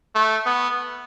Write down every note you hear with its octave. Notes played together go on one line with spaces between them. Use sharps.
A3
B3